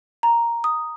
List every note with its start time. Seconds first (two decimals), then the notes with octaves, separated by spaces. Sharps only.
0.23 A#5
0.64 D#6